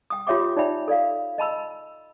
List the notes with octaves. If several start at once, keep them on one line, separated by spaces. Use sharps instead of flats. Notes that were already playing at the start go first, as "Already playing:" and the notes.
G5 D#6
F4 G4 C#5 E5 G5 D6
D#4 C#5 D5 E5 G5 B5
A4 D5 F5
D#5 A5 B5 E6